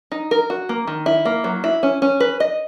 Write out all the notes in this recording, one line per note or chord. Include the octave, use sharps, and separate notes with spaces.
D#4
A#4
F#4
A#3
D#3
E4
A#3
F#3
E4
C#4
C#4
B4
D#5